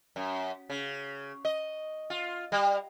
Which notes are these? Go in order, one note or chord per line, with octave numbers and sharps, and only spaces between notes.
F#2
C#3
D#5
F4
G3